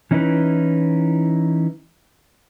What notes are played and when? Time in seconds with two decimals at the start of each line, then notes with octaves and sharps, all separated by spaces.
0.11 E3 C#4 D#4 E4 B4